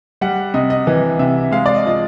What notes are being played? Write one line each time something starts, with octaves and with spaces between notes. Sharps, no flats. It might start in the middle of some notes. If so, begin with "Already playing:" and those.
G3 F#5
C3 D#5
D#5
E3 D#5
C3 E5
G#3 F5
D5
D#5
F3 D#5